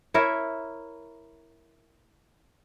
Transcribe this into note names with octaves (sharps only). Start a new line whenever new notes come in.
E4 A#4 C#5 E5